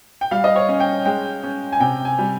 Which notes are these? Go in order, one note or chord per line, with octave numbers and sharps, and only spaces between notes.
G5
G3 F5
D#5
C#5
C#4
G5
G#3 G5
C#4
G#5
C3 G5
G#5
G3